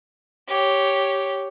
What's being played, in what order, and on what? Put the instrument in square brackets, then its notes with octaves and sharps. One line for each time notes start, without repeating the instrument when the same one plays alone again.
[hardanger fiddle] G4 C#5